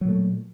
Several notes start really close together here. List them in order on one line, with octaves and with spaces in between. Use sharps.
F#3 A#2 A3